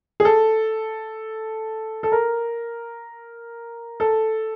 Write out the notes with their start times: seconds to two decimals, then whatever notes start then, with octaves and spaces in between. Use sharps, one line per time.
0.20 G#4
0.25 A4
2.03 A4
2.12 A#4
4.00 A4